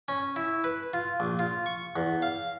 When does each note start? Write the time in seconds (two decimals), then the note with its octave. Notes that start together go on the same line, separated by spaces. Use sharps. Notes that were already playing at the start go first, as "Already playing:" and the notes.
0.08 C#4
0.36 E4
0.64 B4
0.93 F4
1.20 A#1
1.39 F4
1.66 C#6
1.96 E2
2.22 F5